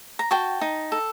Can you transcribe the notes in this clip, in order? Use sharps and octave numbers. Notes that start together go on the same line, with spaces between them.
A#5
F#4 G5 A5
D#4
A4